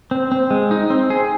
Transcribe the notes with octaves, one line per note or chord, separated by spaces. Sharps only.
C4
C4
G#3
D#4
C4
G#4